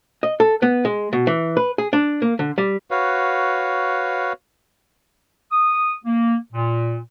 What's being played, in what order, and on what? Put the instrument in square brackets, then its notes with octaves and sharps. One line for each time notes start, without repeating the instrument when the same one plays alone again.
[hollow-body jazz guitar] D#5
A4
B3
G#3
B2
E3
B4
G#4
D4
A#3
D3
G3
[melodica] F#4 B4 C#5 F5
[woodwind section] D#6
A#3
A#2